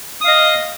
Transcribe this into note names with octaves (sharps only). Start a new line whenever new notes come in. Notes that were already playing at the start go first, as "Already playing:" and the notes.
D#5 F5 D#6